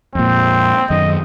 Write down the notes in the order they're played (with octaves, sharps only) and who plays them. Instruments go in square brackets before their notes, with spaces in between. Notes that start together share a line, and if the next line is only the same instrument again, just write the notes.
[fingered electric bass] F2 A#2 [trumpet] C4
[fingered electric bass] F#2 D#3 [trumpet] D#5